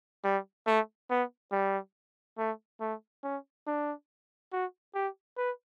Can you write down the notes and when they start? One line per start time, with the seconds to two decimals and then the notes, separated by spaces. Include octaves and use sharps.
0.24 G3
0.67 A3
1.10 B3
1.52 G3
2.38 A3
2.81 A3
3.24 C#4
3.67 D4
4.52 F#4
4.95 G4
5.38 B4